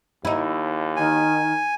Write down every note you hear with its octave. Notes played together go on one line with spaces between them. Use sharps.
D#2 D#4 E4
D#3 G#5